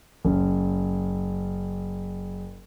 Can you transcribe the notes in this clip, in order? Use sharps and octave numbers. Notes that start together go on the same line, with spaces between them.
F#1 C#4